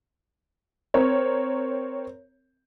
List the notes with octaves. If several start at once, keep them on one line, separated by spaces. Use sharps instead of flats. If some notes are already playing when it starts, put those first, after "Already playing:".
C4 A#4 C#5